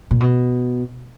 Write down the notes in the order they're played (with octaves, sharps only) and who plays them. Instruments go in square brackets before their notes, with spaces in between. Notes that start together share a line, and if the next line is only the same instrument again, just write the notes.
[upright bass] A#2
B2